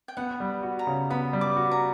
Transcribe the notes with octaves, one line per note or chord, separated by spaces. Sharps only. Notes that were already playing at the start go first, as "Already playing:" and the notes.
G5
B3 F#5
G3
F#4
A#5
C#3
B3 B5
G3
D6
F#4
A#5